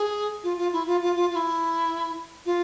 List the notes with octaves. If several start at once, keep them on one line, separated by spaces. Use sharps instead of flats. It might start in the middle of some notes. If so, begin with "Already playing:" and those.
Already playing: G#4
F4
F4
E4
F4
F4
F4
F4
E4
F4